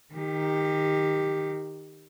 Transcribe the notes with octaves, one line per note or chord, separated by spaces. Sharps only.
D#3 G4